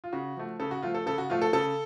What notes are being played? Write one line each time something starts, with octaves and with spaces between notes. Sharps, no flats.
F4
C#3 F#4
F3 A3
C#3 A4
F#4
F3 A3 F4
A4
C#3 A4
F#4
F3 A3 F4
A4
C#3 A4